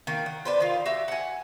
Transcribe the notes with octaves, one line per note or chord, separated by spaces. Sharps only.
D#3 A#3
F#5
D4 B4 C5
D#3 F4
F#4 G4 E5
F#5 G#5